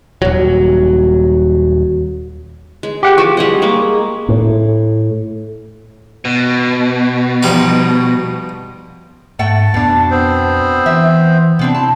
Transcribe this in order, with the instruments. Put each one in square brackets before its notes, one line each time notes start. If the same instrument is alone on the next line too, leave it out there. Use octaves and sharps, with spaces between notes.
[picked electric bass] D#1 F#3
[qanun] G#3
[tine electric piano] G4 F#5 G5
[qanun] F3 [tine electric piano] C#6
[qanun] G3 G#4 D#5
G#3 A#3
[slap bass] A2
[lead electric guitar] B2
[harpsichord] F3 G3 D#4
[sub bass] G#2 [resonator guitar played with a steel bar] A3 F#5 G5 [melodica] A5
[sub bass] F2 [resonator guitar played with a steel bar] B2 D4
[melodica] B3 C4 C5
[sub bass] E3 [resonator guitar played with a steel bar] E5
[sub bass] C3 [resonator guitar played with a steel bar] B3 C4 D4
[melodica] E4 [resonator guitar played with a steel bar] A5